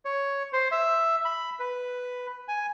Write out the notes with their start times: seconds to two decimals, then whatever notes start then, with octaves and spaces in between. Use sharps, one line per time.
0.05 C#5
0.53 C5
0.72 E5
1.25 B5
1.59 B4
2.48 G#5